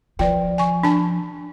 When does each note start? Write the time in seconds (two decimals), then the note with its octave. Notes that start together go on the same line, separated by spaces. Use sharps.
0.19 F3 B4 D5 G5
0.58 G#5 C#6
0.83 D4 A5